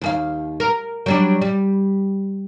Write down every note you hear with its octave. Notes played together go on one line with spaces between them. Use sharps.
D#2 G#4 F5
A#4
F#3 G3 D4
G3